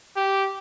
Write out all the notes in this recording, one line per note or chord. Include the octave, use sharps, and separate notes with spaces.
G4